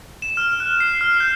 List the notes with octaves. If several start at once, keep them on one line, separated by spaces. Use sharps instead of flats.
E7
F6
F#6
C7
F6
G6